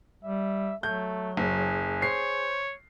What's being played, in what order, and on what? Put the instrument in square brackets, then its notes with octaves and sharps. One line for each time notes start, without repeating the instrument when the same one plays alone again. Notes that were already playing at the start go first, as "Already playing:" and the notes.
[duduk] G3 [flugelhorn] E5
[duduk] F#3 [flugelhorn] A3 [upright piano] G6
[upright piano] F#1 [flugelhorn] G#4
[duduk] C5 [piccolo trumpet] C#5 [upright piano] C7